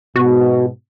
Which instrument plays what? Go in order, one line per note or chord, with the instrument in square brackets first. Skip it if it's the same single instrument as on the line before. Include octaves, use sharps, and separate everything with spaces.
[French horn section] G#2 B2 [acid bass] F#4